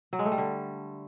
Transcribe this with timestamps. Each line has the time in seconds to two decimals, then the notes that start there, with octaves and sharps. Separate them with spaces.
0.13 F#3
0.19 G#3
0.25 A3
0.32 G3
0.38 D3